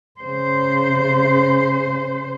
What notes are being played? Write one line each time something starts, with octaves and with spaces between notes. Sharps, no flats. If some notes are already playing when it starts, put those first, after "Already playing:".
C#3 C5